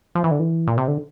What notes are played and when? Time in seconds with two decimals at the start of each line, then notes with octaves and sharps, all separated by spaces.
0.15 F3
0.24 E3
0.31 D3
0.40 E3
0.67 A#2
0.78 C3
0.88 D3